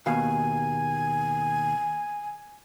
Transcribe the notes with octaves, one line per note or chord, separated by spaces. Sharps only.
D#2 B2 F5 G#5